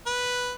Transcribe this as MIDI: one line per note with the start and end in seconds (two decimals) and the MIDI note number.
0.06 0.52 71